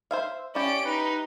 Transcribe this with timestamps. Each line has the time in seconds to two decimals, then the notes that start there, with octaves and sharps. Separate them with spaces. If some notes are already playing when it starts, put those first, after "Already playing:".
0.11 C5 E5 F5
0.55 C#4 E4 G4 D5 D7
0.85 D#4 B4